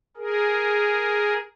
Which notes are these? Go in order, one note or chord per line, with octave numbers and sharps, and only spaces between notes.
G#4 A#4